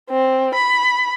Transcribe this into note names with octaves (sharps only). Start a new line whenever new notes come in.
C4
B5